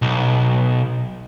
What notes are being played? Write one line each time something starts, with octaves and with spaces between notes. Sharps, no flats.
B1